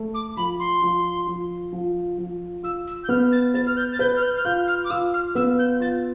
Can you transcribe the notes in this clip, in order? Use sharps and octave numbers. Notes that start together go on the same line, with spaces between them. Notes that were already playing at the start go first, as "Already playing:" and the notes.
Already playing: A3
D6
F3 B5
C6
F3
F3
F3
F3
F4 E6
E6
G6
B3 F6
A6
B4 A6
F6
G6
A6
B4 G6
F6
G6
F6
F4 G6
F6
D6
F4 E6
F6
B3 E6
G6
F4 A6